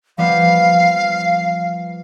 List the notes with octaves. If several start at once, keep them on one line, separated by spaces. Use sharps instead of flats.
F3 G3 B3 F5